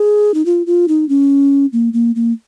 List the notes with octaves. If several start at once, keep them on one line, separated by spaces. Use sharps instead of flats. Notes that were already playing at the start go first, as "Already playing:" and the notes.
Already playing: G#4
D#4
F4
F4
D#4
C#4
A#3
A#3
A#3